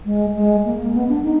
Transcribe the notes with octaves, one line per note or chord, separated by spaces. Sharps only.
G#3
G#3
A#3
A#3
B3
D4
D#4